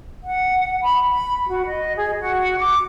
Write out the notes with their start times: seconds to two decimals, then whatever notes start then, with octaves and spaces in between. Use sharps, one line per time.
0.24 F#5
0.82 B5
1.10 B5
1.47 F#4
1.67 D#5
1.96 G#4
2.21 F#4
2.59 D6